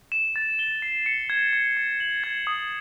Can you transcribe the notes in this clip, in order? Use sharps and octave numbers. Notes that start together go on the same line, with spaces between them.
E7
A6
G7
C7
C#7
G#6
G#6
C#7
F#7
G#6
D#6